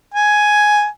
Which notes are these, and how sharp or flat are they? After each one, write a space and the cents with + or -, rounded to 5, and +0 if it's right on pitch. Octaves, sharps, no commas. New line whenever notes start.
G#5 +5